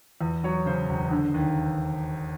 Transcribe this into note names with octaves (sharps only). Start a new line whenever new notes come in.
E2
F#3 C#5
C#3 C5
E1
D3
D#2